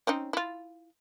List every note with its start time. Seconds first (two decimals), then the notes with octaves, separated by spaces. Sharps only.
0.07 C4 C#4 D#4
0.33 E4 F4